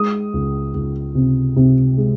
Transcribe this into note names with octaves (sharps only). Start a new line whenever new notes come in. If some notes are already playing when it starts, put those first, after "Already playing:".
Already playing: G#3 D#6
C#2
C#2
C3
C3
G#3